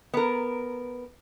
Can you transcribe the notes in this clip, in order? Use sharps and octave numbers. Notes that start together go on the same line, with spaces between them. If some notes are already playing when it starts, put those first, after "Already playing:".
B3 A#4